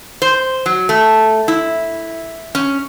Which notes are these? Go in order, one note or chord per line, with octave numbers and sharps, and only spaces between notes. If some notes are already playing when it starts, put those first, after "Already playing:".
C5
F#3
A3
E4
C#4